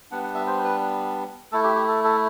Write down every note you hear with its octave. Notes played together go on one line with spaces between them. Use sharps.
G3 B3 D4 F#5
F#5
E5
C5
B4
A3 E4 A4
G4
G4
A4
A4